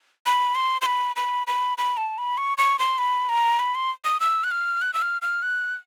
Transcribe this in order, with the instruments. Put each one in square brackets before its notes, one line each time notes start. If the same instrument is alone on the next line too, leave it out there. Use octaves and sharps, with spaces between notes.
[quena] B5
C6
C6
B5
B5
B5
B5
A5
B5
C#6
C#6
C6
B5
A#5
B5
C6
D#6
E6
F#6
F6
F#6
E6
F6
F6
F#6